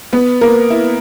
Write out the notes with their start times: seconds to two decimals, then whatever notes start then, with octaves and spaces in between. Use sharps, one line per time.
0.13 B3 B4
0.41 A#3 A#4
0.70 E4